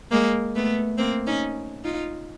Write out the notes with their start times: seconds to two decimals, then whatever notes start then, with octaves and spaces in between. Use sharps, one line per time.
0.12 G#3 A#3
0.55 A3 B3
0.98 A#3 C4
1.27 C#4 D#4
1.84 D#4 F4